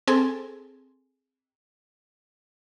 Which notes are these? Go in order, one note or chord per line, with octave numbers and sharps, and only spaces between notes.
C4 G#4 A4 G#5